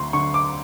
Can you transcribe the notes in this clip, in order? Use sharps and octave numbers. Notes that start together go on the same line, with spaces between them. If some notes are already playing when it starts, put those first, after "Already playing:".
Already playing: D2 C6
D3 C#6
D6